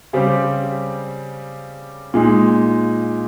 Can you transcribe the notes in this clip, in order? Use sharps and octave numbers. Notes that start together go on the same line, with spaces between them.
C#3 G3 C4 G4
A#2 G#3 D#4